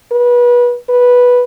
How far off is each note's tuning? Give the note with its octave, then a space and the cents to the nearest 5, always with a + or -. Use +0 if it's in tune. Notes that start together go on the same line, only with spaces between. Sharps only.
B4 -25
B4 -10